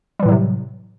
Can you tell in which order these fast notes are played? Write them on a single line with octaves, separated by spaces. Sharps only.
G3 E3 A2 F#3 C3